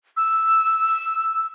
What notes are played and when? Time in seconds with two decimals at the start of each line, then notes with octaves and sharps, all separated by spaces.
0.17 E6